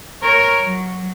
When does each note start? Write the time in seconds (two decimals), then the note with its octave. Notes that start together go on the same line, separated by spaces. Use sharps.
0.23 A#4 C#5
0.61 F#3